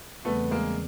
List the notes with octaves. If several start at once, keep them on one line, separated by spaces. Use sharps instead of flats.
E2 C#3 E3 G3 A3 B3 C4
G#3 A#3